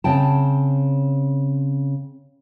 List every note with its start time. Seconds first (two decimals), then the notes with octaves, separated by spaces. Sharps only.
0.04 C#3 C4 G5 A5